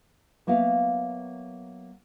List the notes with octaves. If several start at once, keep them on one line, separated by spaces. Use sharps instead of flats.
F#3 A#3 B3 E5 F5